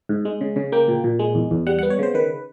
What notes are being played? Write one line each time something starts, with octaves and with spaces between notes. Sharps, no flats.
G#2
G#3
C#3
C#3
A#3 G5
A#2
A#2
G#3
E2
E2
G3 F#5
F#5
B3
C#5
C#3 C5
D#3 B4